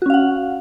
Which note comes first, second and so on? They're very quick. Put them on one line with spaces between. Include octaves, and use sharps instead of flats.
F#4 C#4 F5 F#5